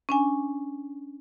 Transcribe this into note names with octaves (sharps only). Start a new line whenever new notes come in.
C#4 D4 G#5